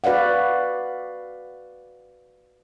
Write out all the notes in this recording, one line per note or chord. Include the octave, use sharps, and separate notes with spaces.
F#4 B4 D5 F5 F#5